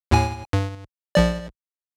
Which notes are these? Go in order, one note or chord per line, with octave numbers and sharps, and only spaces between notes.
D#2 A2 G#5
G2
A#1 F3 D5